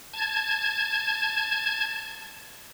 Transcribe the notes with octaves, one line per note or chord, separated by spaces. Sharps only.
A5 G#6